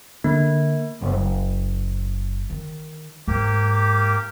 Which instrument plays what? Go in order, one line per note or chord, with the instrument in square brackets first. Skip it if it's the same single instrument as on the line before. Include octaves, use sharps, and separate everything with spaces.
[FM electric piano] D3 [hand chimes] A#3
[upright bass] F#1
D#3
[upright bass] G#2 [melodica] A#3 G4